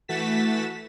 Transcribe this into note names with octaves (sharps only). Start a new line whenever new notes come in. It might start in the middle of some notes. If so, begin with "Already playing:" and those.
E3 A3 F#4 A6 B6 E7